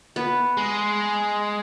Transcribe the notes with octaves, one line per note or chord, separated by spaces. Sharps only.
B3
G#3